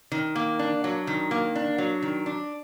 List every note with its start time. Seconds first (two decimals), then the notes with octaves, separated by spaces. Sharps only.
0.12 D#3
0.36 A#3
0.59 D4
0.84 F#3
1.07 D#3
1.31 A#3
1.55 D4
1.78 F#3
2.02 D#3
2.26 D4